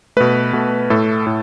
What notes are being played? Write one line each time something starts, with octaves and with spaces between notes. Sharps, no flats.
B2 A3 B4
B2 A3
A2 A3 A4
A2